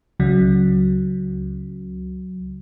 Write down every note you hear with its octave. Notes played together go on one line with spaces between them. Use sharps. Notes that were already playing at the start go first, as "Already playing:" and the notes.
C#2 C#3 F#3